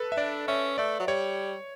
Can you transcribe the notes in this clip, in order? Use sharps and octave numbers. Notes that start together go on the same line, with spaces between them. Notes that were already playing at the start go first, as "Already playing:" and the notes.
Already playing: A4 B4
E5
D4 D5
C#4 E5
A3 D5
F#3
G3 C#5